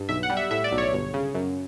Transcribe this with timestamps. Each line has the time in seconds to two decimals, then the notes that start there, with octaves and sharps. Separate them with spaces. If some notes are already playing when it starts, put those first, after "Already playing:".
Already playing: G2
0.09 B1 E5
0.23 F#5
0.30 G3
0.37 E5
0.51 A2 E5
0.64 D5
0.71 B1
0.78 C#5
0.92 G1
1.14 C#3
1.34 F#2